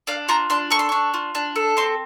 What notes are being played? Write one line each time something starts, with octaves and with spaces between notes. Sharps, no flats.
D4 F5
F4 A#5
D4 C6
A4 C#6
C6
D4 C#6
F4
D4
A4
C4 C6